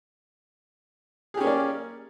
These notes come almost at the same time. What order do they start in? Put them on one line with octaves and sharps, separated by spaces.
G#4 G4 C#4 A#3 D5